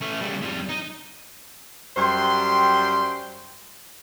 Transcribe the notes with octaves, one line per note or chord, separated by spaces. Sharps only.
A3 C#4
C#3 G3
F2 G3
D#4
F#2 G3 C5 G5 C6